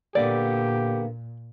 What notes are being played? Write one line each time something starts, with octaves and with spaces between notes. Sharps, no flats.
A#2 D3 A#3 B3 G4 D5